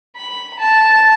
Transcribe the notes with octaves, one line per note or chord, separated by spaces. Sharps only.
B5
A5